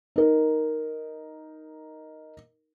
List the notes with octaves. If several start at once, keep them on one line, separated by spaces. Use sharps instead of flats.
D#4 A#4